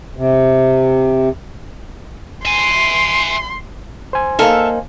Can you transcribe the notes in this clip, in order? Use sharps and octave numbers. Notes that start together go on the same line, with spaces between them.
C3
E5 G#5 C6
C5 G#5
A#3 D#4 A4 E5 F5